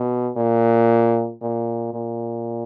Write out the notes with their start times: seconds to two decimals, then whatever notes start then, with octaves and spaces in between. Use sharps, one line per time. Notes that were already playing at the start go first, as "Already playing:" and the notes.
Already playing: B2
0.36 A#2
1.41 A#2
1.94 A#2